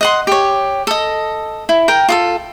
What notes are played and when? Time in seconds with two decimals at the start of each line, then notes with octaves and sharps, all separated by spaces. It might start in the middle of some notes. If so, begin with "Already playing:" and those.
0.01 D#5 F#5 C6
0.27 G4 C#5
0.87 A4 D#5
1.69 E4
1.88 A#4 G5
2.09 F4 G#4 A4